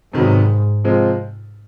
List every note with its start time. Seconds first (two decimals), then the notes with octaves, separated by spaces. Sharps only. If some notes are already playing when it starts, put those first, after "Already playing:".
0.13 G#2 C3 D#3 F#3 B3
0.84 C3 F3 G#3 C4 F4